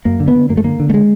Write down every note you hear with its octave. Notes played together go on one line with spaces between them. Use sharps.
F#2 A#3
D3
B3
D3
F#2 A#3
A3
D3 A#3
D3
A3
G#3